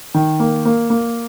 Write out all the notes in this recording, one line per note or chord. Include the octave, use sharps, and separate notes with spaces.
D#3
A#3
A#3
A#3